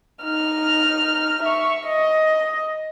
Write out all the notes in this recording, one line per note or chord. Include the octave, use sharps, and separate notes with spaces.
D#4 F6
E5 C#6
D#5